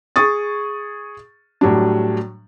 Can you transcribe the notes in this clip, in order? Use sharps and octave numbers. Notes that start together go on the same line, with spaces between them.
G#4 C#6 D#6 A6
A2 F#3 G3 D4